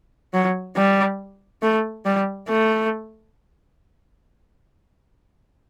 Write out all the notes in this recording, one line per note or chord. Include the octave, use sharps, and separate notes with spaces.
F#3
G3
A3
G3
A3